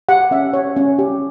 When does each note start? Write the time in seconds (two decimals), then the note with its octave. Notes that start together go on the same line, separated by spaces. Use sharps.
0.09 G4 F#5
0.31 C#4 E5
0.54 C#5
0.76 C#4
0.99 G4